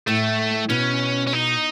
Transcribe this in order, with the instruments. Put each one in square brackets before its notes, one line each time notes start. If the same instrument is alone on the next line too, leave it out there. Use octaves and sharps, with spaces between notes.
[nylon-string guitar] A2 [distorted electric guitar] A3
[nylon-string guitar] B2 [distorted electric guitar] C#4
[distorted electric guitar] C#4
D#4